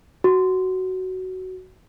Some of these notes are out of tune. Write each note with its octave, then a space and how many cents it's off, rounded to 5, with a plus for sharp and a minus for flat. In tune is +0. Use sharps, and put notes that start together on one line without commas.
F#4 +10